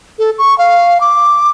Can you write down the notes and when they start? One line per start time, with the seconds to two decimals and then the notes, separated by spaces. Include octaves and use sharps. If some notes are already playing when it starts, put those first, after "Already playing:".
0.19 A4
0.38 C#6
0.58 F5
1.01 D6